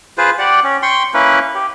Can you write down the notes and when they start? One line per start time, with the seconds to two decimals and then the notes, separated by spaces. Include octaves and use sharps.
0.18 F4 G#4 B4 C5
0.38 G4 D5 F#5
0.63 C#4
0.82 G5 C6 C#6
1.14 A#3 C#4 E4 B4
1.55 G4